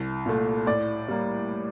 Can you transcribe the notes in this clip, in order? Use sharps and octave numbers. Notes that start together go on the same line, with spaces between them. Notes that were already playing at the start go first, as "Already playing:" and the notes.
Already playing: C2
A#2 A3
A2 D5
G3 A#3